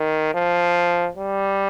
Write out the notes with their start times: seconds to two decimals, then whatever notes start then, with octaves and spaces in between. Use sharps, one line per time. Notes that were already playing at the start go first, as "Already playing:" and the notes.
Already playing: D#3
0.35 F3
1.17 G3